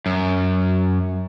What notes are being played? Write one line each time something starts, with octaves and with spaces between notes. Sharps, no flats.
F#2